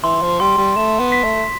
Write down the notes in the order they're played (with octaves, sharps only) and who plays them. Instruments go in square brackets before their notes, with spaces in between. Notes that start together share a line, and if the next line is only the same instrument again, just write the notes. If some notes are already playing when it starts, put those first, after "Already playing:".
[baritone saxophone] E3 [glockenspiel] C6
[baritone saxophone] F3
[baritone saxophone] G3 [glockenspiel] C6
[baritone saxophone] G3
[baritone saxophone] A3 [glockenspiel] E7
[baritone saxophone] B3
[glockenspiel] B6
[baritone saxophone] A3